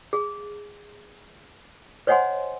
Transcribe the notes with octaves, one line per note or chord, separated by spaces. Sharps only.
G#4
C5 C#5 D#5 F#5 G#5 C6